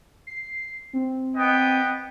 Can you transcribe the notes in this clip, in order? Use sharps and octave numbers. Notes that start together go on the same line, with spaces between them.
C7
C4
B3 D#5 G5